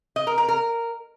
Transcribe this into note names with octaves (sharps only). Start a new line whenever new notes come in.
D#5
A#4
A#4
A#4